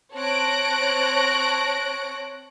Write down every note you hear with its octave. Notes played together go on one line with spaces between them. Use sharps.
C4 C#5 A5 F#6 A#6 D7